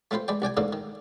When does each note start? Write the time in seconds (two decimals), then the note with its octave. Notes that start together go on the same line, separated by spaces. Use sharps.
0.11 A3 C4 F4 B4 C5
0.28 G#3 B4 D5 G5
0.42 C2 D5 G5 G#5
0.57 G#2 D3 E3 A3 A#3 D4
0.73 D#3